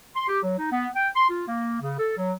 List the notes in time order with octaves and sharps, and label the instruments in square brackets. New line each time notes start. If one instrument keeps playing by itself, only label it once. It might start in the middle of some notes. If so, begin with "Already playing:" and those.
[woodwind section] C6
G4
F#3
D#4
B3
G5
C6
F4
A#3
C#3
A4
F#3